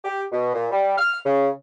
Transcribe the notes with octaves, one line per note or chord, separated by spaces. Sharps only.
G4
B2
A#2
G3
F6
C#3